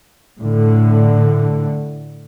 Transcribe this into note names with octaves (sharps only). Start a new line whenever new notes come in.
A2 D3